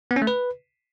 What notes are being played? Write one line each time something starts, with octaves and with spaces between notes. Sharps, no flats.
B3
C#4
A3
B4